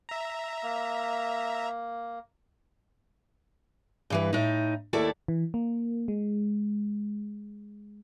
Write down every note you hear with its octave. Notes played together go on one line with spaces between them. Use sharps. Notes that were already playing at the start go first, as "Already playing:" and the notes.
E5 A#5
A#3
G2 E3 B4
A2 D#4
D#2 A3 E4 A4 D5
E3
A#3
G#3